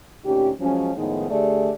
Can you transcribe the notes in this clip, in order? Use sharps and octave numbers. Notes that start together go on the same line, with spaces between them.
D2 A#2 C#4 D#4 G4
F3 F#3 G#3 C#4
A2 D#3 F3 G#3 B3 D#4
D3 A3 G4 G#4 D5